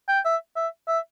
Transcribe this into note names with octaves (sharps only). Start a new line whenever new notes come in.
G5
E5
E5
E5